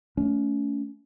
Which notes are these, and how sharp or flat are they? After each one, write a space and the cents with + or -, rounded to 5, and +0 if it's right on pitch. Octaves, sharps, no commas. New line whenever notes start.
A3 +0 C#4 +30